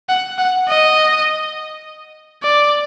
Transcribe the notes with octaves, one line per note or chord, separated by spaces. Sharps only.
F#5
F#5
D#5
D5